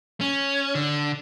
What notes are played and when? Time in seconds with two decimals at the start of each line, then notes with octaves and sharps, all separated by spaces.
0.21 C#4
0.75 D3